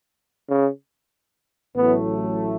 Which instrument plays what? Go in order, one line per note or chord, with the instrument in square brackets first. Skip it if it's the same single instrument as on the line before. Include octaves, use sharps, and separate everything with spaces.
[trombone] C#3
[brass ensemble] A1 A2 F#3 A3 E4 [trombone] B3